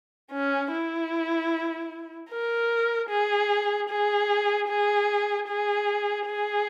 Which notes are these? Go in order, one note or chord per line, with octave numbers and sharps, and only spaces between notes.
C#4
E4
A#4
G#4
G#4
G#4
G#4
G#4